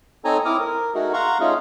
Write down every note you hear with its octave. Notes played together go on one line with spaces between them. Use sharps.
C4 D#4 A4 C#5 G#5 A#5
C4 E4 D6 D#6 F6
A#4
A3 D#4 F#4 G#4 A#4
F5 F#5 A#5 C6 C#6
A3 C#4 D#4 F4 G#4